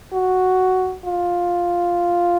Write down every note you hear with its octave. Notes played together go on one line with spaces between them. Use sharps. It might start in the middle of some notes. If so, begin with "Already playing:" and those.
F#4
F4